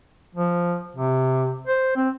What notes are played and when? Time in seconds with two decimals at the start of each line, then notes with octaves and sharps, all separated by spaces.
0.35 F3
0.96 C3
1.67 C5
1.96 C4